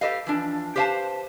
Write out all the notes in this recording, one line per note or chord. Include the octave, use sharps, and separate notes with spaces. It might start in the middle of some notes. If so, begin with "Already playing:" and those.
G4 A4 B4 D#5 F5
E3 F3 D4
G4 B4 C5 F5 G5 A5